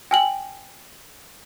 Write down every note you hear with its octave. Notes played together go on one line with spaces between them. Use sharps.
G5 G#5 F#7